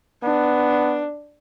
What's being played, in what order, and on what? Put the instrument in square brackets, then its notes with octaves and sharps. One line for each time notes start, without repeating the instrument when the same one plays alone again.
[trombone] B3 [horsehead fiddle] D4